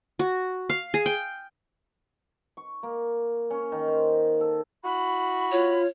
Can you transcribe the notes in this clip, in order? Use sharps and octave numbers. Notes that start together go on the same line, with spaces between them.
F#4
F5
G#4
G5
C#6
A#3
C#4
D#3
C5
A4
E4 F#4 B5
F4 C#5